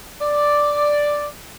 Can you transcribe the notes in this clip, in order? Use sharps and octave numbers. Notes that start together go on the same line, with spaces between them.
D5